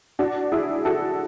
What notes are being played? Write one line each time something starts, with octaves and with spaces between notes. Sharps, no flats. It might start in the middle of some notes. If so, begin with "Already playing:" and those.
D4 F#4
E4 G#4
F#4 A4